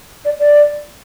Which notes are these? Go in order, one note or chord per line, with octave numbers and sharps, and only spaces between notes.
D5
D5